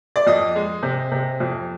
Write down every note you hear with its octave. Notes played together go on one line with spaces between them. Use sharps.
D5
F2 D#5
G#3
C3
C3
F2